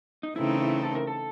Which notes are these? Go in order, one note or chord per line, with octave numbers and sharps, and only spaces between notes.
D#4
C#3 E3 A3 C4 D#4 E4
E4
A4
A#4
A4